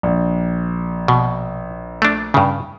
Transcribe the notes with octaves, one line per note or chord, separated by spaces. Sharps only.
A#1
B2
A3 D4
G2 C#3